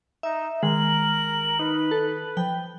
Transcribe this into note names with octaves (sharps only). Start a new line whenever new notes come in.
D#4 E5
D#3 G#3 A#4 F#7
D#4 B4
A4
F3 G5